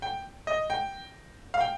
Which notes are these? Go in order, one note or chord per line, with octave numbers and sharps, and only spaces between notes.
G5
D#5
G5
F5
G5